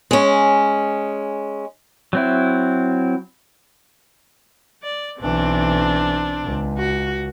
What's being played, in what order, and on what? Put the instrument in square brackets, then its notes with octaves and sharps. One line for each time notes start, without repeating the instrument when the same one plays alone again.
[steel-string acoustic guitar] G#3 C#4
[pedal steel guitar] F#3 C4 E4
[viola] D5
[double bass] B1 E3 [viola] C4 D4
[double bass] C#2
[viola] F#4